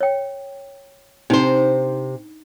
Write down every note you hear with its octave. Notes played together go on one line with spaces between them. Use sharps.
C#5 G5
C3 D4 D#4 C5